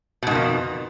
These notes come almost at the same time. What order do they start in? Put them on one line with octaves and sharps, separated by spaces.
B2 G#2 D#3 F2